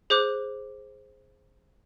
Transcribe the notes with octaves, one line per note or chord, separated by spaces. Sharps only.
G#4 C5 D6 F#6